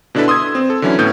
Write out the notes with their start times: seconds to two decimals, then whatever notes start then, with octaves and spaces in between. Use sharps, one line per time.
0.15 B2 D3 D4 E4 A4 B4
0.28 C6 D#6 E6 G#6
0.55 C4
0.70 A4
0.82 D3 E3 F#3 C#4 E4
0.99 A2 B3 C#4 G6